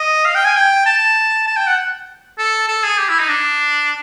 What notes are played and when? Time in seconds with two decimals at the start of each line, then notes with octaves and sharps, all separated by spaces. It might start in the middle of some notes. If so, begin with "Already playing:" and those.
Already playing: D#5
0.25 F5
0.35 G5
0.45 G#5
0.56 G5
0.86 A5
1.47 A5
1.57 G5
1.67 F#5
2.39 A4
2.68 A4
2.84 G#4
2.98 G4
3.09 E4
3.19 D#4
3.29 D4